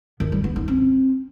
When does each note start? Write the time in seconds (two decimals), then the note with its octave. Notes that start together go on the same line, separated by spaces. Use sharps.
0.20 D#3
0.32 G3
0.44 B3
0.56 D#4
0.68 C4